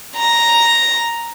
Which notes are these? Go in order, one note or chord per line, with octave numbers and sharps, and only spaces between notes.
A#5